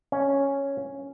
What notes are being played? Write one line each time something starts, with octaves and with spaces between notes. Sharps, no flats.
C#4